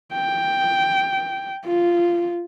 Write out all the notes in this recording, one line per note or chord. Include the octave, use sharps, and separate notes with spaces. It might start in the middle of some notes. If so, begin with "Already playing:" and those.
G5
F4